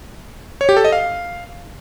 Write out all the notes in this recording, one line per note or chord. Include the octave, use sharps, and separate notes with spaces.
C#5
G4
A4
D#5
F5